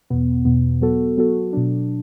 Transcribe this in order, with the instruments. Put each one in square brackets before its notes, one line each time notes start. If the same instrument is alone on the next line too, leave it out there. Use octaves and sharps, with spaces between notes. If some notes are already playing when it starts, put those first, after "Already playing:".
[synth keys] E2 B2 B3
E2 B2 B3
F#3 B3 F#4 A4
F#3 B3 F#4 A4
B2 F#3 D4